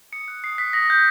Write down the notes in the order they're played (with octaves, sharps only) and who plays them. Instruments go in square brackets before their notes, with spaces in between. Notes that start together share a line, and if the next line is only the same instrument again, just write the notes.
[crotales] D#6 C#7
F#6
D#6 C7
F#6 B6
D#6 A#6
F#6 G6